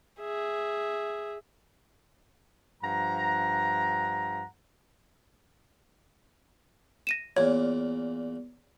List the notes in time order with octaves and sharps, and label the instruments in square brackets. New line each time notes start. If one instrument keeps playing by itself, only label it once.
[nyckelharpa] G#4 E5
[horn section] G2 F3 F#5 A#5
[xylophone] A#6 D#7 E7
[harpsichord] E2 A#2 [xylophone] C#5